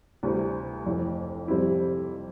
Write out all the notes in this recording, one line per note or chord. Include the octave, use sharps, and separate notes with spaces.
D2 C3 E3 G3 C4
F1 F2 E3
F2 C3 G3 C4 E4